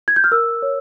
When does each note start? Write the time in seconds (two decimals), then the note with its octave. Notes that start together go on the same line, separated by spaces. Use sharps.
0.08 G#6
0.16 G6
0.24 F6
0.32 A#4 E6
0.62 C#5